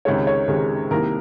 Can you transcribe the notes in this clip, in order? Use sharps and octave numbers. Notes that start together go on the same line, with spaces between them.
C#2 C3 D#3 G#3 C#5
C#5
C#2 C3 D#3 G#3
C2 C3 D#3 A#3 A#4